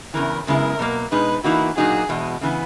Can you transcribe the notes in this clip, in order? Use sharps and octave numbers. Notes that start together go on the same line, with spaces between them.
E2 C#3 E3 A#4
F#2 C#3 G#3 B3 E4 A#4
B2 F#3 A#3
B2 G#3 D#4 B4
E3 A#3 D#4 E4 F#4
A#2 F#3 A#3 D#4 F#4 G#4
E2 B2 G#3
C#3 E3 B3